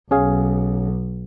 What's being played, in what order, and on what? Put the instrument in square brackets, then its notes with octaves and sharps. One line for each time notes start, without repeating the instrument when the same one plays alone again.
[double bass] B1 [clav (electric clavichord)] C#4 G#4 F5